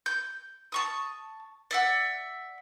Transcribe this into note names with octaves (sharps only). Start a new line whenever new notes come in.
G6
A5 C#6 D#6
D5 E5 F#5